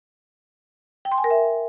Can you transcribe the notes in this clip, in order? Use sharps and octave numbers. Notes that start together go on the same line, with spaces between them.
G5
C6
G#5
A#4
E5